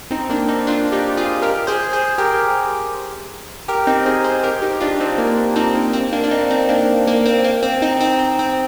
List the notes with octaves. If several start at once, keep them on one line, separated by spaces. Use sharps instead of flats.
C4 D#4
A#3 D4
C4 D#4
D4 F4
D#4 G4
F4 G#4
G4 A#4
G#4 C5
G#4 C5
G4 A#4
G4 A#4
C4 D#4
G#4 C5
G#4 C5
G4 A#4
D#4 G4
D4 F4
C4 D#4
A#3
A#3 D4
C4 D#4
A#3
C4
A#3 D4
D4
C4 D#4
C4 D#4
A#3 D4
A#3
C4
A#3
C4
C4 D#4
C4
C4
C4